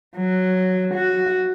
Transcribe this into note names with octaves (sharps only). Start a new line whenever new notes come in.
F#3
F#4